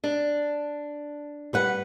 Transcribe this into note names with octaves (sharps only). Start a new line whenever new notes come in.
D4
G3 B4 F#5